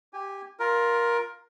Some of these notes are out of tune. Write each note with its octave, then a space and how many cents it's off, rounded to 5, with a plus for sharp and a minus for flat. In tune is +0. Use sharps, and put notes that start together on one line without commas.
G4 +0 G#5 -25
F4 +5 A#4 +15